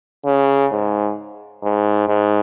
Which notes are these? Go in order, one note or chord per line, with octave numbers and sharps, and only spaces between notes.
C#3
G#2
G#2
G#2